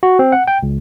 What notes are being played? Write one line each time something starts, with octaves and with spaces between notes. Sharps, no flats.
F#4
C4
F#5
G5
C#2